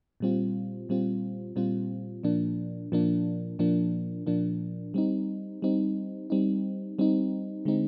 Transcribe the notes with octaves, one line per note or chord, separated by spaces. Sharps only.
A#2 G3 C4 F4
A#2 G3 C4 F4
A#2 G3 C4 F4
A#2 F3 A#3 D4
A#2 F3 A#3 D4
A#2 F3 A#3 D4
A#2 F3 A#3 D4
G3 C4 D#4
G3 C4 D#4
G3 C4 D#4
G3 C4 D#4
D3 G#3 C4 D#4